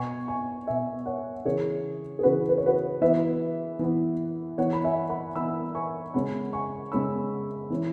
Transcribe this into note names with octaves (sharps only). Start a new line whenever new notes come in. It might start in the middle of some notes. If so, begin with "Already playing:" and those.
Already playing: B2 B3 G#5 C#6
G#5 C#6
B2 B3 E5 G#5
C#5 F#5
C#3 E3 C#4 G#4 C#5
G#4
C#3 E3 C#4 F#4 B4
B4
C#5
F#4 B4
E3 B3 B4 E5
E3 B3
E3 B3 C#5 F#5
B5
E5 G#5
F#5 B5
E3 B3 B5 E6
G#5 C#6
C#3 G#3 C#4 F#5 B5
G#5 C#6
C#3 G#3 C#4 B5 E6
E3 C#4